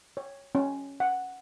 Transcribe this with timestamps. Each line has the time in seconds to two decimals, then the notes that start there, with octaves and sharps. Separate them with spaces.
0.17 C#5
0.55 C#4
1.00 F#5